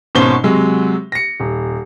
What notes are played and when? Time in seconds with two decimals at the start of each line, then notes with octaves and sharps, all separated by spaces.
0.15 G#1 B2 C#4 C5 G7
0.44 C3 F#3 G#3
1.12 A#6 C#7
1.40 D#1